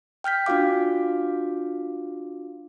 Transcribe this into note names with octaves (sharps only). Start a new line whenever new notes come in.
G5 F6 G6 B6
D4 F4 F#4 F5 D6